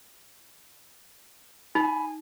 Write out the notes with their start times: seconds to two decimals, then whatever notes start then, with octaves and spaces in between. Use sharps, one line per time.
1.75 D#4 G#5 B5